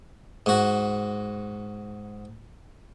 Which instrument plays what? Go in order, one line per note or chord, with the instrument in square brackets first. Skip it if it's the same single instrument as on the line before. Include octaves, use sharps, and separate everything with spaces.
[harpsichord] G#2 F#4